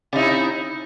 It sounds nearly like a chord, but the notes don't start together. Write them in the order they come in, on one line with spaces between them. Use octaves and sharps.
C3 D#4 E4